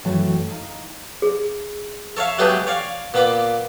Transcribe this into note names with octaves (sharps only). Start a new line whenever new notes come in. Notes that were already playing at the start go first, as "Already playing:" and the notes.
F#2 E3 A3 F#4 G5
D#4 F5
G#4
A4 C#5 E5 F5
F#3 G#3 A3 B3 G4 G#4
C#5 D5 F5
A#2 A#3 B3 B5 D6